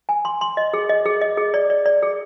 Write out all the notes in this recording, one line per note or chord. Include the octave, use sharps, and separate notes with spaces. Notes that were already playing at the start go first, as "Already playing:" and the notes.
G#5
C6
C6
D#5
G#4
D#5
G#4
D#5
G#4
D5
D5
D5
G#4